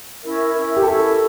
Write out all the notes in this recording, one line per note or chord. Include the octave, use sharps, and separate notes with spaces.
C#4 E4 A#4 E5
C#4 E4 A#4 E5
G4
C#4 E4 A4 A#4 E5